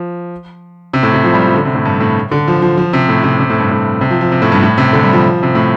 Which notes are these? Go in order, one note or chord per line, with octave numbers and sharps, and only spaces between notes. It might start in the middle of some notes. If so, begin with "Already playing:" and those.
Already playing: F3
C3
A2
C3
F3
G3
F3
D3
C3
A2
G2
A2
D3
F3
F3
F3
C3
A2
C3
C3
A2
G2
A2
C3
F3
F3
C3
A2
G2
A2
C3
D3
G3
F3
C3
A2